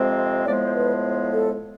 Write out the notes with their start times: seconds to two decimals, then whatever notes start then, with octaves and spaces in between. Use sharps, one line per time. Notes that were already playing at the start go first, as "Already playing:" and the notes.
Already playing: F2 C3 G#3 C4
0.46 A2 F3 G#3 B3 D5
0.66 C5
0.75 B4
1.32 A4